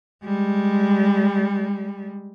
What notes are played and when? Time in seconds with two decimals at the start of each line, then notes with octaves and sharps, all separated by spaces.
0.24 G3 G#3